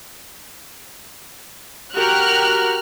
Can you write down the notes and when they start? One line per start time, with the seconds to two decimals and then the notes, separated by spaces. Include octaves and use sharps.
1.93 F#4 G4 A#4 F6 F#6